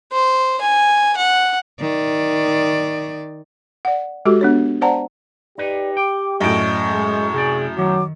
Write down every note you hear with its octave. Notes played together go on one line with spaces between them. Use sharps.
C5
G#5
F#5
D#3 D5
D5 F#5
G#3 F#4 G4 A4
B3 D4 C#5
C5 D5 F#5 A5 A#5
D#4 G4 B4 D5
G5 D6
F#2 A2 D5 D#5 C#6
G#3
C3 G#4 D5
D#3 F#3 D6